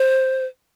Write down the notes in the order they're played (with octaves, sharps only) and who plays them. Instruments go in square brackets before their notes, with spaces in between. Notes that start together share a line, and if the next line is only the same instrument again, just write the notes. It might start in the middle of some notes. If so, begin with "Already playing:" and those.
Already playing: [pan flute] C5